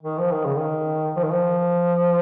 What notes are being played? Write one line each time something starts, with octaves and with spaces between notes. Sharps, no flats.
D#3
F3
D#3
C#3
D#3
F3
D#3
F3